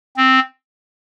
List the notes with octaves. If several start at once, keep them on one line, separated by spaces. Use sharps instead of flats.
C4